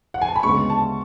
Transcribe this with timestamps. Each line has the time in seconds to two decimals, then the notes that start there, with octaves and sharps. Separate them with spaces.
0.14 F#5
0.22 G#5
0.28 A5
0.36 B5
0.43 D2 C#3 G#3 B3 C#6
0.70 A5